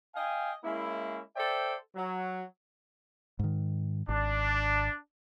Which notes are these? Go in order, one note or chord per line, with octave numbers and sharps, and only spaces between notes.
D#5 F5 G5 G#5
G#3 A#3 C#4 E4
A4 C5 D5 E5 G5
F#3
G#2 D#3
G#1 D4